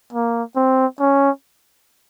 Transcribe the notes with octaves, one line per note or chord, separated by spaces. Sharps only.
A#3
C4
C#4